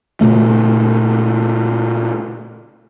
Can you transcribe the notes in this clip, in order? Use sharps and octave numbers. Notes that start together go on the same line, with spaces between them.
A#2 C#3 A3